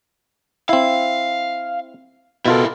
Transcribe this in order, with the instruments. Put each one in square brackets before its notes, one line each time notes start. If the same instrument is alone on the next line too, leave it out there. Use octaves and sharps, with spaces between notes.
[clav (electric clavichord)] C4 E4 [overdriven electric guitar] F5
[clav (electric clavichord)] B2 F4 A4 [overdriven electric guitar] E4 A#4